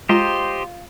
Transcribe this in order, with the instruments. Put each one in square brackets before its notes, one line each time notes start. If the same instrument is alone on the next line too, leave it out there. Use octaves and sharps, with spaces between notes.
[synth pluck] G#3 A#5 E7 [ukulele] F4 [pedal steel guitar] G4 C5 D#5 [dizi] C6